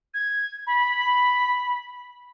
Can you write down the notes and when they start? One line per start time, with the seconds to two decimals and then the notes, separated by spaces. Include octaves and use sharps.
0.14 G#6
0.67 B5